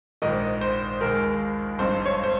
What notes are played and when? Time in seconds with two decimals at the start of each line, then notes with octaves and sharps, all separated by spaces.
0.22 A#1 G#2 D#3 D#5
0.61 C5
1.00 D#2 D#3 G#3 A#4
1.79 G#1 G2 F3 C4 D#4 C5
2.06 C#5
2.24 C5